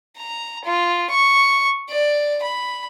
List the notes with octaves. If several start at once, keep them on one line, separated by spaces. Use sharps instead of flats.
A#5
F4
C#6
D5
B5